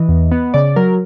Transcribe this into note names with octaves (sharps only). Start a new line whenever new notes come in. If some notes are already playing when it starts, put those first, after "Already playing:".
Already playing: E3 D#5
E2
B3
C#3 D5
F#3 A#4